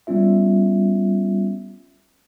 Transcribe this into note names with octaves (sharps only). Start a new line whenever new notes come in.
G3 B3 C#4 F4 E5